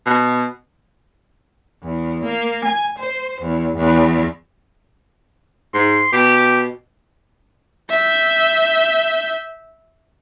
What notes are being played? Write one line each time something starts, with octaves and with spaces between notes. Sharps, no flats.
B2
E2
A#3
G#5
C5
E2
E2
G#2 C6
B2 G4
E5 G6